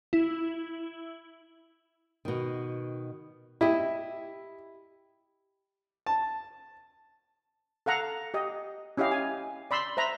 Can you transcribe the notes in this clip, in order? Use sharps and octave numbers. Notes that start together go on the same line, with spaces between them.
E4
B2 D#3
E4 G4 D#5 E5
A5
A4 F5 F#5 A#5
G4 D#5
C#4 E4 G4 D#5 F5
G#5
D5 B5 C6 E6
C5 E5 A#5 B5